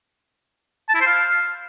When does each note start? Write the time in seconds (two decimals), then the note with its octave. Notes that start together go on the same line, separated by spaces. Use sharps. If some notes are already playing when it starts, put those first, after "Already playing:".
0.89 A5
0.95 E4
1.01 C5
1.07 F5